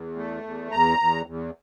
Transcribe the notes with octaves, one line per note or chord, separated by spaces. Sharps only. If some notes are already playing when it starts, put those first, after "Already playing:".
Already playing: E2
A3
E2
E2 A#5
E2
E2